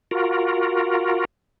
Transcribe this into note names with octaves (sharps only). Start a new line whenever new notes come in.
F4 F#4 A#4